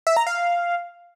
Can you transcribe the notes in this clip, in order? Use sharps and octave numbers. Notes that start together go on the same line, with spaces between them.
E5
A#5
F5